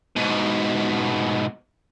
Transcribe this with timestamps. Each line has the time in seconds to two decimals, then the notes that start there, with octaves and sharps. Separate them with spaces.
0.16 G#2 B2